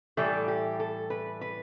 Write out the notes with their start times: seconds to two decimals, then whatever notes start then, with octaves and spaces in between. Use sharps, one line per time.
0.17 A2 E3 G3 A4
0.48 G4
0.80 A4
1.10 B4
1.41 B4